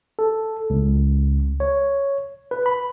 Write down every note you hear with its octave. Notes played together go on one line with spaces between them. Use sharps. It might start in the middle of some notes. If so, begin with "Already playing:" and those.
A4
C#2
C#5
B4
B5